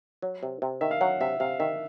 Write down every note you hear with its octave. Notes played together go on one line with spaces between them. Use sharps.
F#3
C3
C3
D#3 E5
F5
F#3 F#5
C3 E5
C3 F5
D#3 E5